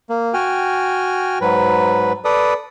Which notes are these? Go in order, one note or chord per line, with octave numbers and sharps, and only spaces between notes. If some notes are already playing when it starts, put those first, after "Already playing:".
A#3
F#4 G5 G#5 F6
G#2 F#3 B4
A4 B4 D5 D#6